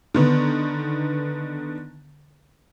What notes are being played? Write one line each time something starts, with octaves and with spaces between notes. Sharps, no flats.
D3 D#3 B3